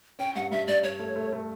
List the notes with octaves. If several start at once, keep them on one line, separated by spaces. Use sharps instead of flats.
C#4 G5
G2 F#5
G2 E5
G2 D5
G2 C#5
A3
A3
A3